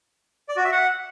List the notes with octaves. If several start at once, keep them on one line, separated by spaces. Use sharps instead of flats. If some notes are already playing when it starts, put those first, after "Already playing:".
D5
F#4
E5
F#5